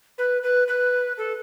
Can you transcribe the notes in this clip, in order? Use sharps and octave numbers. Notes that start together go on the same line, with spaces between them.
B4
B4
B4
A4